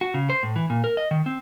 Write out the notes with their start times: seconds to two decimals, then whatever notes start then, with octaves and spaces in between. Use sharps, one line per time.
0.01 F#4
0.14 C#3
0.30 C5
0.43 A2
0.56 E3
0.70 A#2
0.84 A#4
0.97 D#5
1.11 D#3
1.26 C4